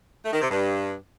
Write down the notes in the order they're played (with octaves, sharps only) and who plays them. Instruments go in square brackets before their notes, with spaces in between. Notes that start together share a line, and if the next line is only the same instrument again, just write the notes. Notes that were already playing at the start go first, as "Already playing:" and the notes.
[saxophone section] A3
D#3
C3
G2